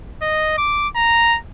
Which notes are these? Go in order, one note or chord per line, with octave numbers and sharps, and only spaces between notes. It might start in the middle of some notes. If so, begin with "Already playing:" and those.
D#5
D6
A#5